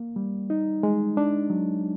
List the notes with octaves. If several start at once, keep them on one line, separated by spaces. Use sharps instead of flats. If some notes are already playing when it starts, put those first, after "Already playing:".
Already playing: A#3
G3
D#4
G#3
D4
F#3